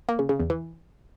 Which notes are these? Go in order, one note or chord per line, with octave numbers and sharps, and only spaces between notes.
A#3
C#3
C#3
E2
E3